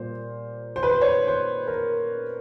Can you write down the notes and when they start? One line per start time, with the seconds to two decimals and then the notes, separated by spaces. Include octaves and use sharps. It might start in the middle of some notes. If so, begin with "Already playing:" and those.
Already playing: A#2 G3 A#3 C5
0.76 C5
0.83 B4
0.89 C5
1.01 C#5
1.28 C5
1.67 A#4